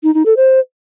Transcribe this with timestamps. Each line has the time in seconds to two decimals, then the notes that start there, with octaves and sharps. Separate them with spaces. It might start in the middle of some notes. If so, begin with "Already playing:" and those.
0.03 D#4
0.15 D#4
0.26 A4
0.37 C5